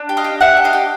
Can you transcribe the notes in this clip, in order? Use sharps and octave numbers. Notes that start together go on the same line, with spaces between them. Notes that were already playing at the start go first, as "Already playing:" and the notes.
Already playing: D4
G4
D#5 F5
G4
D4 E5 F#5
G4
D#5 F5
G4